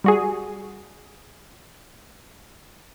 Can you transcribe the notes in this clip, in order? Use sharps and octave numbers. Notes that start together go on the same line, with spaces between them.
G3 F#4 G#4